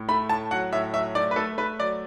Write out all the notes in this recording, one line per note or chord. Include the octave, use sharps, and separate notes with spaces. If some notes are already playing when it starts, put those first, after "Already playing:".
Already playing: A2
A3 B5
A2 A5
F#3 F#5
A2 E5
F#3 E5
A3 D5
B4
A3 A4
A3 B4
F#3 D5